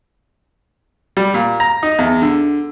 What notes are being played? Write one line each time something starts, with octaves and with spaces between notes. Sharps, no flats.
G3
A#2
A#5
D#4
E2
D3